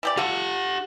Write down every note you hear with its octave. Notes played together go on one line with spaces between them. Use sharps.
E3 G4 D5
F4 G4 A4 F#5